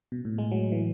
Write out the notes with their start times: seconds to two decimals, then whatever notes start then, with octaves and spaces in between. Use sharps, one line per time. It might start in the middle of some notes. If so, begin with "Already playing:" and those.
0.12 B2
0.25 A2
0.38 G#3
0.51 F#3
0.72 E3